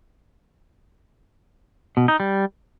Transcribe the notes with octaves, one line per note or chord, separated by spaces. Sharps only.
B2
D#4
G3